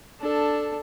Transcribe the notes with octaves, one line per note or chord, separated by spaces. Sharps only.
D4 A4